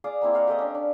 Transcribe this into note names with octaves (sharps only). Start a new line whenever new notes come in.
G#4 D5 F5 D#6
A#3 C4 E4
D#5 F5 F#5
G4 A4 D#5 D#6
C#4 D4
D4